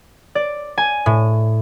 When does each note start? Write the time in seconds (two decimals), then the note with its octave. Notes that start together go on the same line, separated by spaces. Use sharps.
0.35 D5
0.78 G#5
1.06 A2